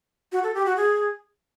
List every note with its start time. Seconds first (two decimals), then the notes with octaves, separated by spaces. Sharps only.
0.32 F#4
0.43 A4
0.55 G4
0.66 F#4
0.77 G#4